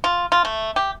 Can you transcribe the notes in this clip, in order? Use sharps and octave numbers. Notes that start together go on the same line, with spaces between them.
F4
F4
A3
G4